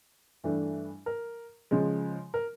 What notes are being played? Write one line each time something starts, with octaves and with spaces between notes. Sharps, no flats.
G2 E3 A3 D4
A#4
C#3 F3 G#3
A#4